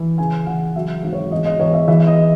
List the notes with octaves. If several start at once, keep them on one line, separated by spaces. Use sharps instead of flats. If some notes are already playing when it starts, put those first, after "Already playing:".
Already playing: E3
C#3 G#5
E3 F#5
F#3 E5
G#1
C#5
E2 D#5
D#5
E2 C#5
E5
E3 E5
D#5